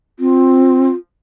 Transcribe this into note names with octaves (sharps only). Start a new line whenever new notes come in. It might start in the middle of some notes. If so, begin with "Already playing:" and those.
C4 F4